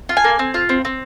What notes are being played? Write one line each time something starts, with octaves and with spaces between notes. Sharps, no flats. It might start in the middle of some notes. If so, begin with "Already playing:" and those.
F4
G#5
A#3
C4
F4
C4
C4